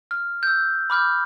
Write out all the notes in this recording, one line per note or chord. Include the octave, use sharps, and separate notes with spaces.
F6
E6 G6
B5 D6 F6 G6